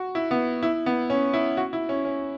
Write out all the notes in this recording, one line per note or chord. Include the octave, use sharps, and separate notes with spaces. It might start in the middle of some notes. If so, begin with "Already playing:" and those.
Already playing: F#4
E4
B3
E4
B3
C#4
E4
F#4
E4
C#4
C#4